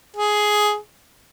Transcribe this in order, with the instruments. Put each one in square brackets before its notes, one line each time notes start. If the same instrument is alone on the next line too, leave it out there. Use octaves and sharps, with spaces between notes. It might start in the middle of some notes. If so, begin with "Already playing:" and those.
[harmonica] G#4